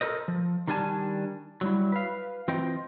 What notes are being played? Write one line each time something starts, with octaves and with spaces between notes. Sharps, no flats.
A4 A#4 C5 D#5
F3
D#3 G3 D4 G#4 G#5 A5
F#3 G3 E4
B4 F5
E3 C4 F4 C5 D#5 G5